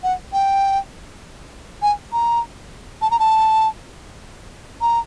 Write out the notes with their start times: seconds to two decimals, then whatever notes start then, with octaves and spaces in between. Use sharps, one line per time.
0.03 F#5
0.33 G5
1.82 G#5
2.13 A#5
3.02 A5
3.11 A#5
3.19 A5
4.81 A#5